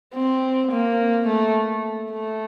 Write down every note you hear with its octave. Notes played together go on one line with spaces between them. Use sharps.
C4
A#3
A3
A3